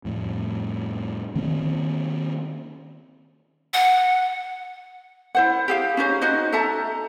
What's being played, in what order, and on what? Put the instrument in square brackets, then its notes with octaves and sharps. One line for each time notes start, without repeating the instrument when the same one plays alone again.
[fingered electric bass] F2 A2
D#3 A#3 C4 C#4
[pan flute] F#5
[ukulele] E4 C5 F#5
G4 G#4 F5
C#4 D#4 C5
D#4 F#4 C5 D#5
A4 E5 A5 A#5